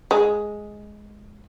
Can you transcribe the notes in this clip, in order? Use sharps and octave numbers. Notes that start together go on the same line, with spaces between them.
G#3